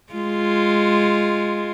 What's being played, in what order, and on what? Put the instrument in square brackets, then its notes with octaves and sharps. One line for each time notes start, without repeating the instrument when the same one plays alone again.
[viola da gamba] G#3 F4